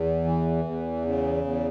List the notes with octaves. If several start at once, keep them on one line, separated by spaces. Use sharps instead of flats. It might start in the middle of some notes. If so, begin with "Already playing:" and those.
Already playing: E2
E3
E2
C#3
E2